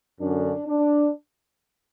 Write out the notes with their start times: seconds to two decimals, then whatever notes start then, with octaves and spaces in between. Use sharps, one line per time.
0.20 F#2 D3 D4
0.67 D4